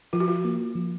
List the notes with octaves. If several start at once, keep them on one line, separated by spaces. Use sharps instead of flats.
F3 F4
F#4
F4
A#3
F3